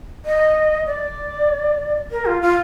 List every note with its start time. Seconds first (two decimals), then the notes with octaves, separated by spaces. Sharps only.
0.25 D#5
0.86 D5
2.11 A#4
2.25 F4
2.41 F4